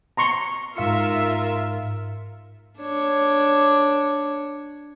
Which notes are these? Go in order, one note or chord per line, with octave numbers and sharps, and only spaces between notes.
A#5 C6 C#6
G#2 F4 A#4 E5 F5 C#7
D4 C#5